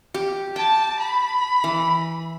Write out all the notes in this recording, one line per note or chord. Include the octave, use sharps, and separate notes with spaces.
G4
G5 A5
B5
E3